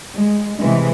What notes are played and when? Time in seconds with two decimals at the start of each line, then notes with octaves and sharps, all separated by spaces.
0.14 G#3
0.58 C3 E3 G#3